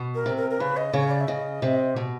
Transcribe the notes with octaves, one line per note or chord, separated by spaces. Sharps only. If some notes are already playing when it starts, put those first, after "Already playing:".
Already playing: B2
A#4
C3
A#4
A#4
C#3 B4
D#5
C#3 C#5
D5
E5
C#3 D#5
C3
B2